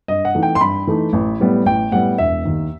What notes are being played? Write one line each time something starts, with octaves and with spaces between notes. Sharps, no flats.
G2 D#5
F#5
E3 A3 D#4
G5
C6
G2 B5
E3 A3 D#4
A1
A2 G3 B3
A1 G5
A2 G3 B3 F#5
E1 E5
D#2 D#3